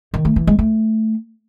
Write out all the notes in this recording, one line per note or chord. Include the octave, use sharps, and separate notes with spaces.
D#3
A3
E3
G#3
A3